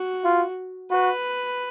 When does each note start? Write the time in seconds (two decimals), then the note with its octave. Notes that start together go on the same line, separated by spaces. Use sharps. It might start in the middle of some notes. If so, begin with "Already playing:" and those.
Already playing: F#4
0.25 F4
0.91 F#4 B4